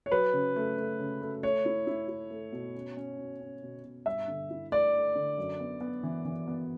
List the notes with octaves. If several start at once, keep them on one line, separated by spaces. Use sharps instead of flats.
C#5
F#3 B4
C#3
A3
A3
C#3
A3
A3 C#5
E4
E4
E4
A3
B2
C#4
C#4
B2
C#4
B2
B2
G2 E5
D3
E4
A3 D5
A3
D3
F#2
B3
B3
E3
E3
B3